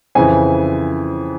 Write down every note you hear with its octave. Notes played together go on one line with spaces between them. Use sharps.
F2 C#3 E3 G#5